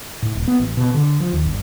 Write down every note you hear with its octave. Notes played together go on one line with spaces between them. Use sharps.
A2
D#1
B3
A1
B2
D3
F3
D#2
G1